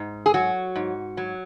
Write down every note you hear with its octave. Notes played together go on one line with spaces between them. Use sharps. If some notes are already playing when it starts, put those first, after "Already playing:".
Already playing: G#2
G#4
F#3 F#4
G#2
F#3